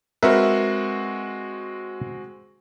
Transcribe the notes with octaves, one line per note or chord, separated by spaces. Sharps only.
G#3 C4 F#4 A#4 B4 E5